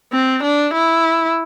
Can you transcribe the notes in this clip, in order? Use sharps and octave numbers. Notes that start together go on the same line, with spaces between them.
C4
D4
E4